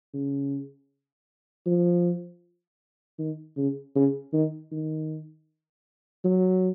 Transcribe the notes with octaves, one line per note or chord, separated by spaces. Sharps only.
C#3
F3
D#3
C#3
C#3
D#3
D#3
F#3